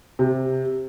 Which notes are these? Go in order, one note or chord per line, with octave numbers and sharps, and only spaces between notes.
C3